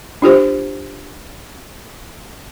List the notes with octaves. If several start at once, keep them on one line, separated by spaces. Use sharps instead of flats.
D4 F4 G4 C5